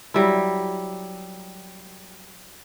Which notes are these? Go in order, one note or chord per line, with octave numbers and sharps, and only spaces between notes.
F#3 G3 E4